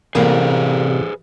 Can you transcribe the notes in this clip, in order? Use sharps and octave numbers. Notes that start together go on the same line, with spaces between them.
A1 C3 G3 A#3 G#4 B4 C5